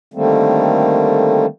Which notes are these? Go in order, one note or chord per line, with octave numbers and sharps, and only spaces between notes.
D3 D#3 G3 A3 A#3 C4